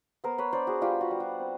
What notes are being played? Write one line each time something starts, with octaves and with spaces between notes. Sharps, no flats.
B3 A#4 C5
B4 C#5
D4 C5 D5
F#4 G#4
G3 F4 G4
F#4
G3
F#4
C4